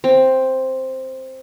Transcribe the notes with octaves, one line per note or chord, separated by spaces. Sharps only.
C4